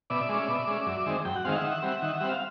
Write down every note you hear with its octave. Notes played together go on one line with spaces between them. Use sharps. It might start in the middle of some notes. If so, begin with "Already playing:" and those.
B2 D5 E5
G#3 C#4
B2
G#3 C#4
F#2
D#3 G#3 C4
F#2 G5
F#5
D#3 G#3 C4 F5
E5 F#5
D#3
G3 C4
D#3
G3 C4
F5